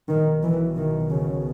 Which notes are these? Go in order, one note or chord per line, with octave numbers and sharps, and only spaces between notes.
B1 B2 D#3
E3
D#3
C#3